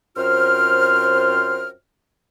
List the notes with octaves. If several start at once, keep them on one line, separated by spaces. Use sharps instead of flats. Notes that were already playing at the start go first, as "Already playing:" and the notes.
F#2 C4 F4 C5 F6